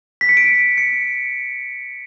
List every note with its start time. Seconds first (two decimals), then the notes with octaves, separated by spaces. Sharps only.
0.21 B6
0.29 C#7
0.37 D7
0.78 C#7